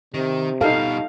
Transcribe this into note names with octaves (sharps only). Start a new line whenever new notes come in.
C3 D#3
B2 G3 D#4 A4 F5